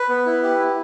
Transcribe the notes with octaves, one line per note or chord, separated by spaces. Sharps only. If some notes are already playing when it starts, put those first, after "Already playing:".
Already playing: B4
B3
E4
G4
E4